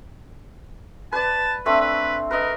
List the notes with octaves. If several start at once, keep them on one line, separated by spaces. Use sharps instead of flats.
B4 D5 A5
A3 C4 D4 B4
B4
A#4 B4 D#5